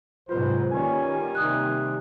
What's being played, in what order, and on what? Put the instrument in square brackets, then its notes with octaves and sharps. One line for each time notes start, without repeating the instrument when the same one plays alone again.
[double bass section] G#2 C3 F#3 [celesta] F4 B4 B5 [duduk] C5
[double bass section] D#3 G3 A#3 [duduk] C#4 [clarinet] G#5
[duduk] C3 [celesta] D#4 D#6 F#6